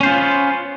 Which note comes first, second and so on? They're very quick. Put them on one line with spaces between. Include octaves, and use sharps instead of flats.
C#4 C5 F4 B3